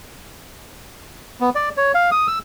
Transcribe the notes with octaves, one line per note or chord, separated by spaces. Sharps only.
B3
D5
C#5
F5
D#6
E6